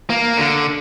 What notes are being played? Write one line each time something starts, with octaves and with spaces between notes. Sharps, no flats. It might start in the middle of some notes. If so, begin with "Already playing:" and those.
A#3
D3